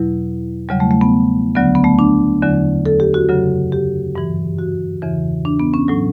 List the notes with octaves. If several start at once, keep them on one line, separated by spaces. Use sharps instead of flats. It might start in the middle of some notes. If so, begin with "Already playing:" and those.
Already playing: E2 B2 F#3 E4
E2 C#3 F#3 G3
A3
A3
B3
D2 D3 F#3 B3
B3
A3
D4
E2 D3 F#3
A4
G4
F#4
F#2 C#3 F#3
G4
G2 E3
F#4
E2 C#3 E3
D4
B3
C#4
A2 F#3